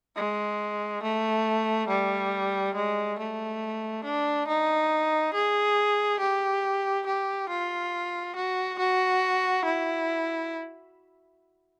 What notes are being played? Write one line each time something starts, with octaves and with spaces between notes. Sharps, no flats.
G#3
A3
G3
G#3
A3
D4
D#4
G#4
G4
G4
F4
F#4
F#4
E4